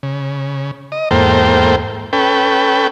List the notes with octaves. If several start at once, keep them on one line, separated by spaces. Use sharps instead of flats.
C#3
D#5
E2 G#2 A#3 A4 C5 G5
C#4 A4 B4 G5